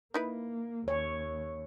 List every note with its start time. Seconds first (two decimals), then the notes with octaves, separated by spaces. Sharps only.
0.14 A#3 D#4 E4 B4
0.88 D#2 C#5